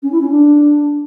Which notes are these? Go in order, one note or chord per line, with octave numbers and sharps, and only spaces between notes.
C#4
E4
C#4
D4